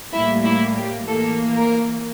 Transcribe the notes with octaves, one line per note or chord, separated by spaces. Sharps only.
A2 G3 A#3 E4
E4
G4
E3 A#3 A4
A#4